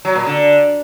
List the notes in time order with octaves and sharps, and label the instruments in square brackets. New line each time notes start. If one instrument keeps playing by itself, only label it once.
[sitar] F#3
A#2
D3